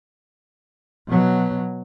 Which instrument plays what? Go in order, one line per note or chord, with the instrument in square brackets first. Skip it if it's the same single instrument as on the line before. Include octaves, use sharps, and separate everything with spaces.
[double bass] B2 F#3